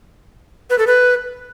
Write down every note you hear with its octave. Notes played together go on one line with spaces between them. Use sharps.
B4
A4
B4